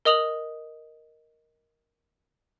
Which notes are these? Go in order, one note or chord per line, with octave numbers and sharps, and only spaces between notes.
A#4 D#5 D#6 F7 F#7